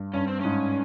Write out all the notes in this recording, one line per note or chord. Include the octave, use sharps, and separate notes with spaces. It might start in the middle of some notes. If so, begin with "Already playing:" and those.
Already playing: G2
G2 C#4
C4
G#2 C#4